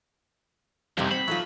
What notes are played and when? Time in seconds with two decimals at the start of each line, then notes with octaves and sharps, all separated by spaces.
0.98 C2 F2 C3 G3 D#4
1.11 C4 C5 F#5 B5
1.28 F#3 D#4 F4 A4 E5